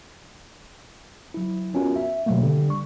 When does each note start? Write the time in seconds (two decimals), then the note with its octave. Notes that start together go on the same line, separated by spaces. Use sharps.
1.34 F#3 E4
1.74 B3 C#4 F4 F#4 A#4
1.96 E5
2.26 B2 D#3 F#3 G3 A3 A#3
2.43 D3 G3
2.70 C#6